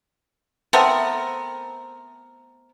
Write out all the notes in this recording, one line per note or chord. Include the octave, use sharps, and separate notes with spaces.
A3 B3 C4 A#4